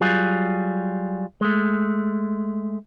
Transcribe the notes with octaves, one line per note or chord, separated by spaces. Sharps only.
F#3 G3 F4 G#4
G#3 A3